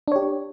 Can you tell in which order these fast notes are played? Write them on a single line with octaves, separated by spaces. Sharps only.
D4 C#5 G4